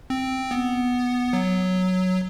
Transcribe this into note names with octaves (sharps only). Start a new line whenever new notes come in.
C4
B3
F#3